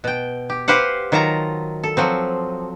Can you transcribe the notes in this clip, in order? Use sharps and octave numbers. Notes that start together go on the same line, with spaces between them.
B2 G5
G4
G4 B4 C5 F5 F#5
D#3 F#3 F4 A5 A#5
A4
F3 F#3 C4